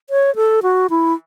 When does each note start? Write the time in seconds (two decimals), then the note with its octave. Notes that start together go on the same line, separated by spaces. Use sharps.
0.10 C#5
0.36 A4
0.63 F#4
0.90 E4